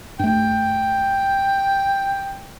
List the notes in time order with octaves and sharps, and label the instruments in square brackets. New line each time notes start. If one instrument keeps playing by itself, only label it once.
[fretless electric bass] G2 A3 [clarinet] G5